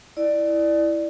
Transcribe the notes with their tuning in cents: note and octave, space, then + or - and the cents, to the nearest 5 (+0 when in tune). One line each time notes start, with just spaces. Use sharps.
E4 +0 D5 +10